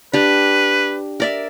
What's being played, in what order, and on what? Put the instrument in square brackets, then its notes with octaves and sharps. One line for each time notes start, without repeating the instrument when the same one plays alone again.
[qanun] D4 G4 [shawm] B4
[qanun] A#4 D5 E5